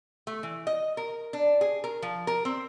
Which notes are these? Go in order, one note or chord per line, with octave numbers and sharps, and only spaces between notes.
A3
E3
D#5
A#4
D4
G#4
A#4
F3
A#4
C4